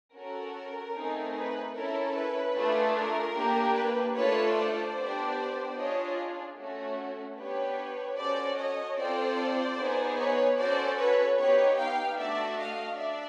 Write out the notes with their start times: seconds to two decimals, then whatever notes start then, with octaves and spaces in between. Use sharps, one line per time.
0.14 C#4 F#4 A4 A#4
0.94 A3 C4 D#4 G#4
1.35 B4
1.74 C#4 E4 A4 A#4
2.14 B4
2.55 A3 D4 F4 G#4
2.95 A#4
3.35 A#3 D4 G4
3.75 B4
4.15 A3 D4 F4 A4 B4 C#5
4.55 C5 D5
4.95 B3 D4 G4
5.75 D4 F4 G#4 C#5 D#5
6.56 A3 C#4 F#4
7.36 B3 D4 G4 B4 C#5
8.16 C#4 F#4 A4 C5 D5
8.56 C#5 D#5
8.97 C4 F4 A4 C5 D5
9.77 B3 D#4 G#4
10.17 B4 C#5
10.57 C#4 F#4 A4 C5 D5
10.97 B4 C#5
11.37 B3 D#4 G4 B4 C#5
11.77 F5 G5
12.18 A3 D4 F#4 A4 D5 E5
12.58 D#5 F5
12.98 D4 D5 E5